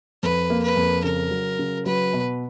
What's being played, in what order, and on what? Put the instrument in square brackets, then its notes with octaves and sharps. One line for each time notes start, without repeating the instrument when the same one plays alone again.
[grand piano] F2 [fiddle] B4
[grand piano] A#3
[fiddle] B4
[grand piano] F2
[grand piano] C#3 [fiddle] A#4
[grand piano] F#3
C#3
[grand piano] F#3 [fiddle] B4
[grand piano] B2